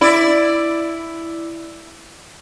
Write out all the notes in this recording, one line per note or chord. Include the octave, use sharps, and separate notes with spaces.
E4 D5